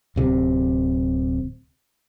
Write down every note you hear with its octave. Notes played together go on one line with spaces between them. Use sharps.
D1 C3